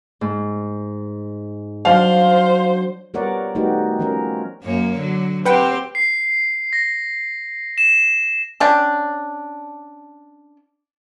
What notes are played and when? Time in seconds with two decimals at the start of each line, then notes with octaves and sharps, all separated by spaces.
0.21 G#2
1.85 F#3 D4 C5 F5
3.14 G3 B3 A#4 C#5 D5 F#5
3.55 G3 A3 B3 D#4 F#4 G4
3.99 F3 C#4 A#4
4.63 F#2 A#3 C#5
4.97 D3 F#3
5.45 C4 G4 B4 C5 F#5 G5
5.95 C7
6.73 A#6
7.78 E7
8.60 C#4 D4 G5